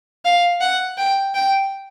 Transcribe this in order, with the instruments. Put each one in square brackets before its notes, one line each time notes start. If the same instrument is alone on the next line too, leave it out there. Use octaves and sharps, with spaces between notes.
[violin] F5
F#5
G5
G5